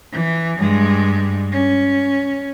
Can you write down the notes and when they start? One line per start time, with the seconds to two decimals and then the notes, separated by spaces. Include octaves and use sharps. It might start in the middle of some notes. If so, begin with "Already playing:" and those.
0.12 E3
0.58 G2 G#3
1.53 C#4